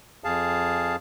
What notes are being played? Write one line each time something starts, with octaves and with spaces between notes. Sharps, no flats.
F2 G#4 F5 A5